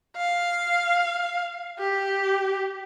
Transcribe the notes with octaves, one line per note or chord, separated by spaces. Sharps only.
F5
G4